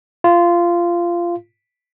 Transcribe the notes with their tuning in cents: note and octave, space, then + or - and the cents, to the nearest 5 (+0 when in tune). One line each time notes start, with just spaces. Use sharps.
F4 -15